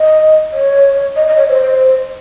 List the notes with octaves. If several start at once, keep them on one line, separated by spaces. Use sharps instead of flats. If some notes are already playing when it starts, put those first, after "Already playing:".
Already playing: D#5
C#5
D#5
D#5
C#5
C5